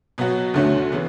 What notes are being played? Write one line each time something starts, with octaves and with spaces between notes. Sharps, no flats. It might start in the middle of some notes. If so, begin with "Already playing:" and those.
B2 F#3 B3 F#4
D2 D3 A3 C#4 F#4
C#3 E3 B3